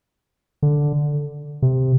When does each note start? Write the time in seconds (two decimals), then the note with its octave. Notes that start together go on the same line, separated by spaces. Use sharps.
0.63 D3
1.62 C3